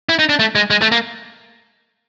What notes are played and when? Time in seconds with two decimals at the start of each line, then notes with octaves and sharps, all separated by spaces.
0.09 E4
0.19 D#4
0.29 D4
0.39 A3
0.55 G#3
0.70 G#3
0.82 A3
0.92 A#3